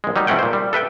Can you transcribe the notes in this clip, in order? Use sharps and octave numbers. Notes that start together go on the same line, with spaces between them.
A#1 G#3
F#3 G3 D#4
C#2 A3 C4 C#4 F#5 G5
A#2 C5
G3
A4 B4 E5 G5